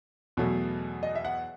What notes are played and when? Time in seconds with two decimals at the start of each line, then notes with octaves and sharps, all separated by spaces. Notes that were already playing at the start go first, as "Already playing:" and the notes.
0.37 E2 B2 F#3 A3
1.03 D#5
1.15 E5
1.25 F#5